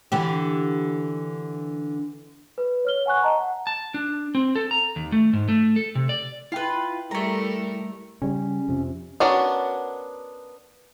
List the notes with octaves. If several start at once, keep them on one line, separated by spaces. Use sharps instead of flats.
D3 E3 G4
B4
C#5 F6 G7
F#5 G#5 C#6 F#6
D#5 A5 A#5
F#5
A5
D4
C4
A4
A#5
D#2
A3
G#2
A3
A4
C3
D5
E4 F4 B4 G5
G3 A3 A4 A#4 A#5
C#3 G3 C#4
F2 C3
B3 C#4 D4 F#4 A#4